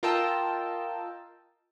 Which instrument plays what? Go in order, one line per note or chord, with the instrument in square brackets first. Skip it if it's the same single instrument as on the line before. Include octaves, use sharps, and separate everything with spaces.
[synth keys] F4 A#4 D#5 G5 A5 E6